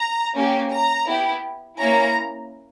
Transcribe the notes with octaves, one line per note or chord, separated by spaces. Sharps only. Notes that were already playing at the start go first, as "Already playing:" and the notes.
Already playing: A#5
A#3 C#4 G4
A#5
B3 E4 G4
A#3 C#4 E4 A#5